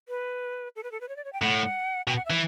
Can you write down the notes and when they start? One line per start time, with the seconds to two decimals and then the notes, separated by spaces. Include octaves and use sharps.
0.09 B4
0.76 A4
0.83 B4
0.92 A4
1.01 B4
1.09 C#5
1.16 D5
1.25 C#5
1.33 G5
1.42 A2 F#5
2.08 B2 G5
2.16 F#5
2.25 E5
2.30 E3